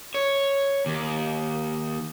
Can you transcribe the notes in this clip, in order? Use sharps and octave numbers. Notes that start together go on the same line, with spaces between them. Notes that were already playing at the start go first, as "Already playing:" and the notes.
C#5
D#2